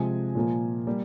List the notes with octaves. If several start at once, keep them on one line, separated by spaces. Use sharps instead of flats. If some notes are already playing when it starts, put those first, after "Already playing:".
Already playing: C3 F3 G#3 G#5
A#2 F3 A#3
G3 A#3